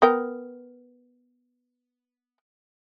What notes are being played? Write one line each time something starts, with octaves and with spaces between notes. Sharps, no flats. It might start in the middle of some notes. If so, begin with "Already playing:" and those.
B3 A#4 G5